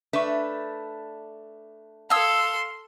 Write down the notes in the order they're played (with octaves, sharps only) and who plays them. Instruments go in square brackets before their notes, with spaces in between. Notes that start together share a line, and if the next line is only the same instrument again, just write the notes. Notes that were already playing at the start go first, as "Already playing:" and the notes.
[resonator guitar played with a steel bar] A3 D4 B4 [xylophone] E5 C#6
[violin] A4 C6 [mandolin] F5 E6 [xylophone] A5 D#6 G#6